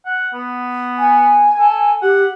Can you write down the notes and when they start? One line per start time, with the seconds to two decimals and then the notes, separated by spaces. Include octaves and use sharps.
0.06 F#5
0.34 B3
0.98 G#5
1.59 A4
2.02 G4 F#5